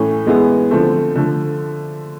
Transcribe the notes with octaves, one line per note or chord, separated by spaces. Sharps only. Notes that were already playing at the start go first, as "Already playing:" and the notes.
Already playing: A2 E3 A3 C#4
E3 G#3 B3 E4 G#4
D3 F3 A3 C4
D3 F3 A3